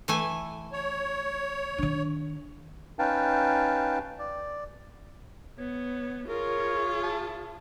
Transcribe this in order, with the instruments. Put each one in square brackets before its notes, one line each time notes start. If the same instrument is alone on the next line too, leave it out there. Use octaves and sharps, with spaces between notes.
[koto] E3 A3 G#5
[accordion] C#5
[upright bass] D#3 D4
[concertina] C#4 D#4 B4 F5 G5 A5
D5
[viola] B3 [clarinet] C#5
[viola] F4 G#4 [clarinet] A#4 [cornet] C#5
[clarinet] A5